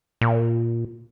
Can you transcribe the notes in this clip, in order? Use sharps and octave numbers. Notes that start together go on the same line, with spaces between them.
A#2